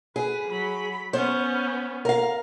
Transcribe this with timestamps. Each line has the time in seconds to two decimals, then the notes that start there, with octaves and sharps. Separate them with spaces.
0.16 G#4 B4
0.47 F#3 B5
1.13 B3 C#4 C5
2.05 A#4 F5